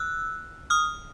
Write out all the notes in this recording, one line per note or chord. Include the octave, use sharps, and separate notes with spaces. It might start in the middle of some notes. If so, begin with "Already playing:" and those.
Already playing: E6 F#6
D#6 F6